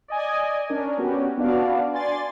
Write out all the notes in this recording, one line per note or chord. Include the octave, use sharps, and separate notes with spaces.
D5 D#5 G#5
C#4 D4 A#4
B3 C#4 F#4 G4
B3 D4 F#4 D5 F5
D5 G#5 C6 A6